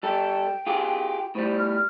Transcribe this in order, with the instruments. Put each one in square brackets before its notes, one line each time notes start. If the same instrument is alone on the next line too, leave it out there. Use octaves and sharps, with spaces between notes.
[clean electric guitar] G3 A4 [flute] G5
[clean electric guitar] F4 G4 G#4
[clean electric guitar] A2 G3 [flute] C5
[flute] F6